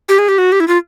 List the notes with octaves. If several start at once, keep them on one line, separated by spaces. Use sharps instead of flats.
G4
G#4
G4
F#4
G4
E4
F4